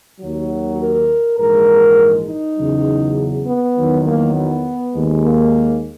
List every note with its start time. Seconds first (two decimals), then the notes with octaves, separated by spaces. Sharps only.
0.21 D#2 D#3 F#3
0.80 A#4
1.39 A#1 G#2 E3 G#3 A#4
2.28 D#4
2.57 E2 C#3 F#3
3.47 B3
3.76 E2 D#3 F#3
4.06 A#3
4.35 B3
4.95 D#2 D#3 G#3
5.25 A#3